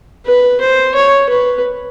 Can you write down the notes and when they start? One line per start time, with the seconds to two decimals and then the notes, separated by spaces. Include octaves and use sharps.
0.26 B4
0.61 C5
0.95 C#5
1.29 B4